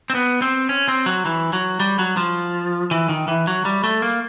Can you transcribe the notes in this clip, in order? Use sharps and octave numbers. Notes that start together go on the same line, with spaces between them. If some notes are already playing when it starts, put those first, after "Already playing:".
C4
B3
C4
C#4
C4
F#3
E3
F#3
G3
F#3
F3
E3
D#3
E3
F#3
G3
A3
A#3